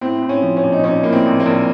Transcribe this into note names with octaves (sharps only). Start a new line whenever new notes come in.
A2 C4
A2
C#4
F3
C#4
A#1
D#4
A#1 C#4
A2 A#3
C4
A#1
A#3
A#1